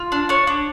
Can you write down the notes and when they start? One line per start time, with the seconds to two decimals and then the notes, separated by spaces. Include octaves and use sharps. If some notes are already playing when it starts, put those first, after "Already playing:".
Already playing: F4
0.12 D4
0.29 D4 C#5
0.47 D4